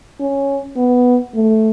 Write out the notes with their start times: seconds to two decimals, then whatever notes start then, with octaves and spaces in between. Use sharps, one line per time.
0.20 C#4
0.77 B3
1.35 A3